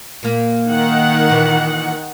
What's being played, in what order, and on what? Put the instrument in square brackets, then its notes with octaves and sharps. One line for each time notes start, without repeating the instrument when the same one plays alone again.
[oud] A#2 A#3
[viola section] D#3 F#5
[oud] A#2 E3